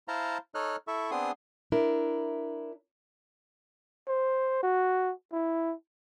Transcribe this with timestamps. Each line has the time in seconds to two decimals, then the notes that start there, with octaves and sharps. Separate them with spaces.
0.08 E4 C5 F5 A5 A#5 C6
0.55 D#4 A4 C#5 D#5 F6 F#6
0.88 E4 A4 E5 C#6
1.11 B3 C4 D4 G#4 C6 D#6
1.72 D4 E4 A#4
4.07 C5
4.62 F#4
5.32 E4